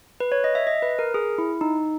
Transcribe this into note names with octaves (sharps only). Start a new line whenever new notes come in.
B4
C#5
D#5
E5
D#5
B4
A#4
G#4
E4
D#4